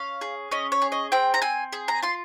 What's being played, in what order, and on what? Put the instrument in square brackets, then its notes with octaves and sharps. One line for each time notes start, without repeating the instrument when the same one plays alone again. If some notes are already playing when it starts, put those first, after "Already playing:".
Already playing: [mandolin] C#4 F5
G#4
C#4 D#5
C#5
G#4
D#5
C4 G5
A#5
C4 G#5
G#4
A#5
F4 C6